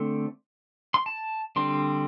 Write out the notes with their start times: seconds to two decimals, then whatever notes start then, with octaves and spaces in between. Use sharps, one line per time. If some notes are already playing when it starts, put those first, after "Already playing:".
Already playing: D3 A3 C4
0.94 C6
1.06 A5
1.56 D3 G3 C4 C6